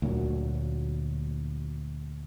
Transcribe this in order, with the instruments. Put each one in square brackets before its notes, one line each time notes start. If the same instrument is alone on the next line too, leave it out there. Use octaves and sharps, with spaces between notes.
[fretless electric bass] D2 A#2 F#3